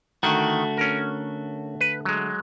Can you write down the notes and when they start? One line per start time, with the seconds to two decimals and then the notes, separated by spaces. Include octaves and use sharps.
0.23 D3 D#3 A3 F#4
0.77 C#4 A#4
1.81 B4
2.05 F#3 G#3